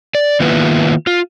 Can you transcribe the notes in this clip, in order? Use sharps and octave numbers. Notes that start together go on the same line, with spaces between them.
D5
D#3 A#3 B3 E4 F4 B4
F4